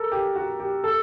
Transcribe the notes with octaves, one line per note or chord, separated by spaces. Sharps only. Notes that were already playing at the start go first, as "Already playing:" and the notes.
Already playing: A4 A#4
G4
F#4
G4
A4